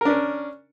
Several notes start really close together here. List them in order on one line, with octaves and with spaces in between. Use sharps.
A#4 D4 C#4